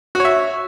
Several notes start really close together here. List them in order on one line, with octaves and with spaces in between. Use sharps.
F#4 C#5 E5